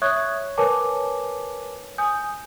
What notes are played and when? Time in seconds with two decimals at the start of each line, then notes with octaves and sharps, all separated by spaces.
0.02 C#5 E5 C#6 D#6 F#6 G#6
0.58 A#4 B4 C#5 G#5 A5 D6
1.98 G#5 D#6 G6